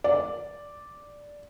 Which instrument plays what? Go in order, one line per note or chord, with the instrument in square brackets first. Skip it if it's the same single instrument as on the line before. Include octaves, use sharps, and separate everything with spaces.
[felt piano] D5